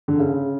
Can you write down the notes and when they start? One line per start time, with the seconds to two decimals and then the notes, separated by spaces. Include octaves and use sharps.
0.08 D3
0.19 C#3